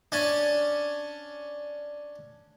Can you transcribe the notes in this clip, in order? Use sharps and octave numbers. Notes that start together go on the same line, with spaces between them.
C#4 D4